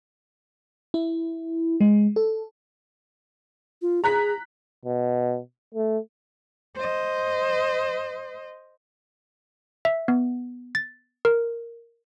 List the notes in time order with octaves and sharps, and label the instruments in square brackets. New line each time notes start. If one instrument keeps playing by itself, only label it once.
[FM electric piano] E4
G#3
A4
[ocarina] F4
[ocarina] G#4 [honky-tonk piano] A#5 F#6 B6
[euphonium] B2
A3
[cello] C5 D#5
[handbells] E5
B3
A6
A#4